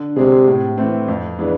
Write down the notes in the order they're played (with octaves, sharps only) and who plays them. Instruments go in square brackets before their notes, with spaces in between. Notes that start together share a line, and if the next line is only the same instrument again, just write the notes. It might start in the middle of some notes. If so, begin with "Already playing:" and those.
Already playing: [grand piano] D3
[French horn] C3 [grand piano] G#3 D4 G#4
[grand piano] A2
E3 A3 C4
F2
E3 G#3 B3 D4